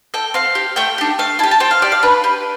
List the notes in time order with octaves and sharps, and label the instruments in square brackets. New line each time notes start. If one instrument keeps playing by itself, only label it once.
[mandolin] A4 G5
C4 F5
G4
A3 G5
D4 G4
A3 F5
E4 A5
G4
A5
C4 G5
F5
G4 D5
F5
D4 B4
G4